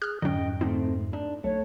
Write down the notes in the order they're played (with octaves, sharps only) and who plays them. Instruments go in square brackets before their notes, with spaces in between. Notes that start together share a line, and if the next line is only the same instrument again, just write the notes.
[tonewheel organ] G#4 [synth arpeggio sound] F6 F#6
[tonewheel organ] F2 G#2 [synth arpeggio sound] D3 F#3 C#4 [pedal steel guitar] D#5 G5
[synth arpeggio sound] D3 D#4 [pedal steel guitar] A3 C4
[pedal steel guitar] D4 [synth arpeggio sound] D#4
[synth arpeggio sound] B1 [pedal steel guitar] A3 [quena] C#5